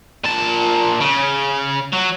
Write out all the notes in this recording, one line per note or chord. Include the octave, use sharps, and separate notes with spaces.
A#2 A5
C#3
F#3